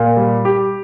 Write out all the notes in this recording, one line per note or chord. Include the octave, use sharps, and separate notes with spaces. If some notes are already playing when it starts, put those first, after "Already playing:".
Already playing: A#2
G3
G4